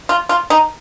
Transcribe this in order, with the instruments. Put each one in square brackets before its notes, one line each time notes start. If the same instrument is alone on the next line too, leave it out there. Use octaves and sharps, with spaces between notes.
[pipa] F4
F4
D#4